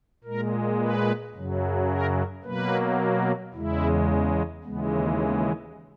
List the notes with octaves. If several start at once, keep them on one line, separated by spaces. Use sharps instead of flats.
A#2 G#3 A#4
B4
F#2 C#3 F#3
A#4
B2 F#3 A#3 B4
E2 C#3 G#3 E4
D#2 C#3 E3 G#3 B3
B3